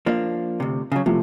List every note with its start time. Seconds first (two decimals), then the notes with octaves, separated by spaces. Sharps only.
0.06 F3 A#3 D4
0.60 D2 C3
0.92 C#3 F#3
1.06 C3 F3 A3